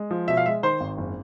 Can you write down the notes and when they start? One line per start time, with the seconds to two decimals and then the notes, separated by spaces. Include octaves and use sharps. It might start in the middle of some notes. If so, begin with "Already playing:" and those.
Already playing: G#3
0.11 F3
0.28 B2 E5
0.37 F5
0.46 G#3 E5
0.63 D#3 C5
0.80 G#1
0.98 F#1